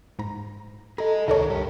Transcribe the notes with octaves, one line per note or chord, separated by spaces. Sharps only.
G#2 A#5
G#4 A4 D#5 A#5
C#2 C3 D#3 D#4 A4 A#4 C#5
G2 G4